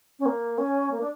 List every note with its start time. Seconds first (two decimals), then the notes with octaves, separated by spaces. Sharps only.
0.19 C#4
0.26 A#3
0.58 C#4
0.91 A#3
1.00 D4